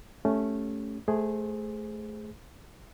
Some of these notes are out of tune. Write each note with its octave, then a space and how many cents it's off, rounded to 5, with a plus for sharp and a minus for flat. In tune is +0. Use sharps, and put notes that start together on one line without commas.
A3 -5 C#4 +0 G4 +0
A3 -20 G#4 +0 C5 +0